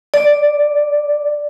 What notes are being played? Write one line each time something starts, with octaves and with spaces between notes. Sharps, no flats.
D5